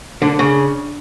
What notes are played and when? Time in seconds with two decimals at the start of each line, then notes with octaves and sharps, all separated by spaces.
0.22 D3 D4
0.39 C#3